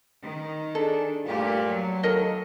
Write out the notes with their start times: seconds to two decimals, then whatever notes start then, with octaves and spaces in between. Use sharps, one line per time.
0.22 D#3
0.75 D4 G#4 A4 D#5
1.26 G2 A#2 A3 G4
1.65 F#3
2.03 D#2 D#4 A4 A#4 D#5